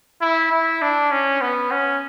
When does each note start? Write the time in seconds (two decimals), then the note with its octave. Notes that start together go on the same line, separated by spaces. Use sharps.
0.21 E4
0.52 E4
0.82 D4
1.11 C#4
1.41 B3
1.71 C#4